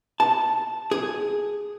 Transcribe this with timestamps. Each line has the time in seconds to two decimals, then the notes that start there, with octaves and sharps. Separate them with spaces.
0.20 A5
0.91 G#4